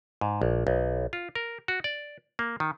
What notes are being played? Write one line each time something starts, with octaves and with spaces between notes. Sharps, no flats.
G#2
A#1
B1
F4
A#4
F#4
D5
A#3
D#3